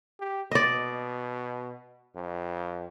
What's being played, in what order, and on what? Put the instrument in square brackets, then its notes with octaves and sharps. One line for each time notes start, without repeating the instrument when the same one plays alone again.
[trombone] G4
[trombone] B2 [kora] D5 D#5
[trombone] F2